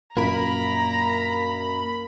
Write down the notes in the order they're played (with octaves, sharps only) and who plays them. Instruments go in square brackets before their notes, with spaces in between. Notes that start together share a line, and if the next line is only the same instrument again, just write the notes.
[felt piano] A#1 F#2 [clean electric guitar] A#3 A#4 [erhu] A#5 [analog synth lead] B5